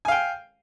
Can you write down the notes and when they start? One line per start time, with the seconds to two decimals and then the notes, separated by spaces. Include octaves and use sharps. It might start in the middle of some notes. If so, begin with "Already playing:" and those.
0.05 G#5
0.08 F5
0.12 G5